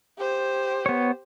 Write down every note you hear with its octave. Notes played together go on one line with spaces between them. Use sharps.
G4 C5
B3 C#5